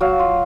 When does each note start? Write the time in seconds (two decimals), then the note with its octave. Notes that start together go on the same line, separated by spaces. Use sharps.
0.01 F#3 F5
0.19 F4